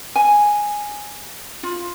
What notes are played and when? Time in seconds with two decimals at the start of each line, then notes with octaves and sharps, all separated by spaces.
0.16 G#5
1.63 F4